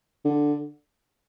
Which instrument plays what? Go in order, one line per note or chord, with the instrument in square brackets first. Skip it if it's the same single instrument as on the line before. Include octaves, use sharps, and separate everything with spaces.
[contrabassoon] D3